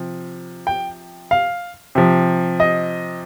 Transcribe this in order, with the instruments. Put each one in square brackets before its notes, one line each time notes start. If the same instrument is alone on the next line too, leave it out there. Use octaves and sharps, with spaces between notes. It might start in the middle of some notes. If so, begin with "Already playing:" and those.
Already playing: [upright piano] C3 F3
G5
F5
C3 F3
D#5